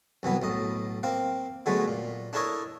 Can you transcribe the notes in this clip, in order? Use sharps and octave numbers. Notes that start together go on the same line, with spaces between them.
C2 E3 F#3 B3
B1 A2 D#5
A#3 C4 F5
D3 F#3 G#3 A3 B3
A#2
D4 E4 A4 A#4 C#5 D#5